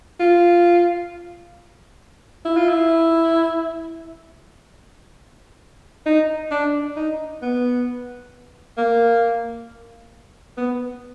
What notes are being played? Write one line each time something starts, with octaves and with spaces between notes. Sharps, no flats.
F4
E4
F4
E4
D#4
D4
D#4
B3
A#3
B3